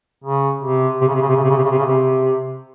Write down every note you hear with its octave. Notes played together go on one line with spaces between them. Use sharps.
C#3
C3
C3
C#3
C3
C#3
C3
C#3
C3
C#3
C3
C#3
C3
C#3
C3